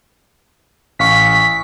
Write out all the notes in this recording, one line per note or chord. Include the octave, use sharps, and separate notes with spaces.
A1 F5 C#6 B6